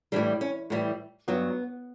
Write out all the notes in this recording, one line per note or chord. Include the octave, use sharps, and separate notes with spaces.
A2 E3 G3 D4
C#4
A2 E3 G3
G2 F#3 B3